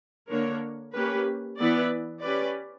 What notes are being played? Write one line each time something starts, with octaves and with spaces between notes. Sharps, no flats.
D3 A#3 D4 A#4 C#5
A#3 C#4 G4 B4
E3 B3 E4 B4 D5
C#4 G4 B4 D5